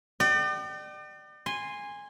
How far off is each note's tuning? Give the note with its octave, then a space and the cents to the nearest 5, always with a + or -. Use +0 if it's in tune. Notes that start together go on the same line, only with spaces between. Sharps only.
D5 +40 G5 -35
G#5 -15 C6 +0